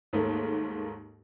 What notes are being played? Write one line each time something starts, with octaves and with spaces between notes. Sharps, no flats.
D#2 G#2 A3 A#3